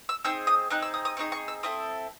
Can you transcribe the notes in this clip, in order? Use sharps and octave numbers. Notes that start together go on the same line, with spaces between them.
E6
C4 D#4 G#4 E6
D#6
C4 D#4 G#4 F#6
E6
D#6
D#6
C4 D#4 G#4 C#6
C#6
E6
C4 E4 A4 D#6